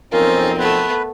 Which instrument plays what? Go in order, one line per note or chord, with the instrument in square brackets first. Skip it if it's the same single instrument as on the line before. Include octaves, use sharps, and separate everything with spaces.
[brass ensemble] B1 F2 C4 [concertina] C#4 F4 F5 [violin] D#4 [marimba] A#4
[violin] A3 B3 [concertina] B4